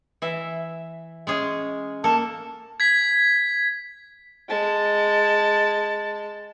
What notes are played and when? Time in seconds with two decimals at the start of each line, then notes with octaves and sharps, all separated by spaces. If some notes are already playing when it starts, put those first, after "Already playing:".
0.22 E3 E5
1.27 G#3 C#4 G#4
2.04 A#3 A4 A5
2.80 G#6 B6
4.48 G#3 A5